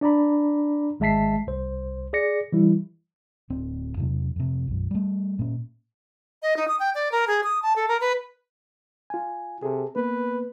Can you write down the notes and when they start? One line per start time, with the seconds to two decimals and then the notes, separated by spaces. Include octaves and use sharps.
0.01 D4 D5 A#5 B5
1.00 G#1 G#3 E5 A5 B6 C7
1.47 C2 C5
2.13 G#4 D5 A#6 C#7
2.52 E3 G3 E4
3.50 D1 C4
3.97 E2 C3 F#3
4.36 F2 C3
4.68 B1 F#2
4.91 G3 A3
5.39 A#2 C#4
6.42 D#5
6.57 D#4
6.68 D#6
6.79 G5
6.95 D5
7.12 A#4
7.27 G#4
7.44 D#6
7.62 A5
7.76 A4
7.88 A#4
8.01 B4
9.10 F4 G#5
9.63 C3 G#4 A4
9.96 A#3 B3 B4